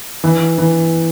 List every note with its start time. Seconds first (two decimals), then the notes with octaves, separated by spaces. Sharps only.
0.24 E3
0.58 E3